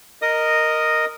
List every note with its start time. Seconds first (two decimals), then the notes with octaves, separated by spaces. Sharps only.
0.22 A#4 D#5 D#6